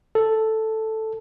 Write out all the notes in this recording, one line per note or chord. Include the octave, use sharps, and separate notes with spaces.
A4